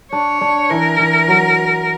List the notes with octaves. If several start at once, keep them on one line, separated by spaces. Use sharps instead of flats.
D4 C#5
D4
E3 A#4
E3
F#3